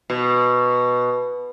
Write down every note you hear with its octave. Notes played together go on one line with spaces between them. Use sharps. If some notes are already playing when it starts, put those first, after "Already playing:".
B2